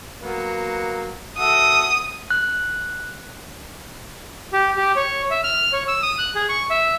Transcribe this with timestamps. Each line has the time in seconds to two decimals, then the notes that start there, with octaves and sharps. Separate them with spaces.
0.22 F#3 A#3 B3
1.38 F#4 A4 E5 D#6
2.30 F#6
4.52 G4
4.77 G4
4.96 C#5
5.31 E5
5.44 F6
5.72 C#5
5.88 E6
6.03 D#6
6.18 F#6
6.35 G#4
6.49 C#6
6.70 E5